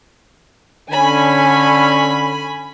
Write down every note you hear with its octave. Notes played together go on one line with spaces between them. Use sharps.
D3 C#4 G#5 B5